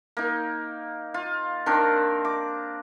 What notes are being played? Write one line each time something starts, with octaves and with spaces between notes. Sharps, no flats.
A#3 D#4
F4
D#3 C4 D4 A#4
D6